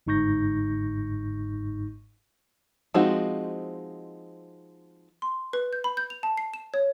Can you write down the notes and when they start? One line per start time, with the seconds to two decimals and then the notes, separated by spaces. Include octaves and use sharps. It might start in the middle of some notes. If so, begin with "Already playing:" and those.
0.07 G1 G#2 D#4 C#6 G6 A#6
2.94 F3 G#3 C4 D#4 F#4
5.22 C6
5.53 B4
5.73 G6
5.84 B5
5.97 G6
6.10 F7
6.23 A5
6.37 C7
6.54 E7
6.74 C#5